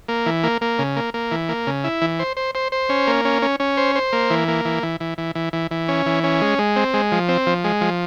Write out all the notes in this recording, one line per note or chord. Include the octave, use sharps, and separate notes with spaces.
A#3
E3
A#3
A#3
C#3
A#3
A#3
E3
A#3
C#3
E4
E3
C5
C5
C5
C5
C#4
A#3
C#4
C#4
C#4
C5
C5
A#3
E3
A#3
E3
E3
E3
E3
E3
E3
E3
C#4
E3
C#4
G#3
G#3
C4
G#3
F3
C4
F3
G#3
F3